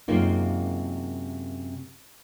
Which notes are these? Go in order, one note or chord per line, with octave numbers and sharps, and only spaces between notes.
F#2 C3 G#3 A#3 D#4 F4